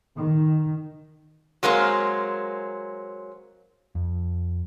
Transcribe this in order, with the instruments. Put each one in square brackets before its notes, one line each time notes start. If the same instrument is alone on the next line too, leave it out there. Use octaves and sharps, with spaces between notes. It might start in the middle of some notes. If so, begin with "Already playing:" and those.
[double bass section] D#3
[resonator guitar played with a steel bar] F#3 G#3 A#3 C4
[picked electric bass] F2